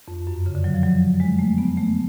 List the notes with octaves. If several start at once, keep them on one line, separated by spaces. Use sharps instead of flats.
F2
F#2
C#3
D3
F#3
F3
F#3
G#3
A3
B3
A3